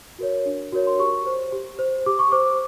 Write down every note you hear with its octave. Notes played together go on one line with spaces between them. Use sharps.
F#4 A#4 C#5
D4
F#4 A#4 C#5
C6
G4 C#6
C5
G4
C5
G4 D6
C#6
C5 D6